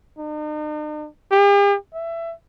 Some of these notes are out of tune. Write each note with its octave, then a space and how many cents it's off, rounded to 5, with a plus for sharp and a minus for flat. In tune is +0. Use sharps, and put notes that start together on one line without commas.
D#4 -45
G4 +45
E5 +20